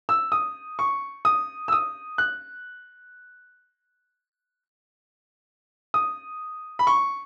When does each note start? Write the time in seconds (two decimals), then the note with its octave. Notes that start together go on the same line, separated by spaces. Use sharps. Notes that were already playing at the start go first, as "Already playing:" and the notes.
0.09 E6
0.32 D#6
0.79 C#6
1.25 D#6
1.68 E6
1.72 D#6
2.18 F#6
5.94 D#6
6.79 B5
6.87 C#6